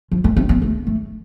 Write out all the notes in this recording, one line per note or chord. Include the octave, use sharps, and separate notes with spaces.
F3
A3
C4
B3
A3
A3